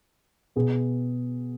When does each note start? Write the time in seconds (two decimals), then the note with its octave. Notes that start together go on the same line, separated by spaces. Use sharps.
0.56 B2 B3 G#4